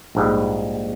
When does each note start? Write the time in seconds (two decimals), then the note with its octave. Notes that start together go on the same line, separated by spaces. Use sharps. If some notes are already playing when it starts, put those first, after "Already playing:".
0.15 A#1 G#2 G3